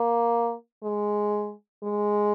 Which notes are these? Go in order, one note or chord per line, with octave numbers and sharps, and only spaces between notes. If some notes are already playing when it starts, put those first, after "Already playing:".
Already playing: A#3
G#3
G#3